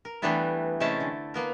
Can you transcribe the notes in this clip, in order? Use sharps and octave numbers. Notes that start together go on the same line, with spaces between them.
A#4
E3 G3 A3 B3 D4 E4
C3 G#3 A3 C#4 E4 A5
D3
A#3 B3 A#4